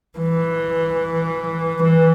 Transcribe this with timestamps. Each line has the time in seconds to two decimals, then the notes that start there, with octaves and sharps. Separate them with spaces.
0.18 E3
1.82 E3